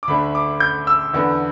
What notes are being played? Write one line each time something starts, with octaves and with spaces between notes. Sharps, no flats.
D6
D2 D3 A3 D4 B5
D6
G6
E6
E2 D3 B3